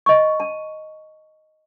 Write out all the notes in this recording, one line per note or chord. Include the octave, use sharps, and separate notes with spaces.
D#5 C#6
A5